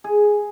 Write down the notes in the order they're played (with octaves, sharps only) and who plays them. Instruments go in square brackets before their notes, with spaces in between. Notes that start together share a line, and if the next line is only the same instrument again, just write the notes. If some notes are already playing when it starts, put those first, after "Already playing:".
[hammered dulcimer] G#4